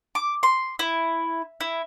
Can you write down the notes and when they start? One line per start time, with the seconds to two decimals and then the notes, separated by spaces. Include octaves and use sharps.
0.15 D6
0.43 C6
0.79 E4
1.61 E4